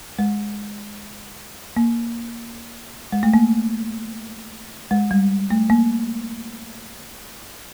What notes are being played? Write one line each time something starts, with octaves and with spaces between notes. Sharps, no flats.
G#3
A#3
G#3
A3
A#3
G#3
G3
A3
A#3